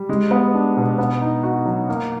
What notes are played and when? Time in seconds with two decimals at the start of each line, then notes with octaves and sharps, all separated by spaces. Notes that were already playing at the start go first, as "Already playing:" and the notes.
Already playing: G3
0.09 G#3
0.31 B3
0.54 D4
0.77 B2
0.98 B3
1.21 D#4
1.43 F#4
1.65 F#3
1.89 A#3